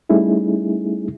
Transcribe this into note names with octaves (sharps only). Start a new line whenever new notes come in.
G3 A3 C#4 D#4 E4 G#4